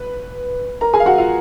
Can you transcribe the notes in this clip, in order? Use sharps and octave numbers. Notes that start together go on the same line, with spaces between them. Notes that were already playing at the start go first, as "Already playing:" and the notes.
Already playing: B4
A#4 A#5
G#4 G#5
F5
F#4 F#5
F4 F5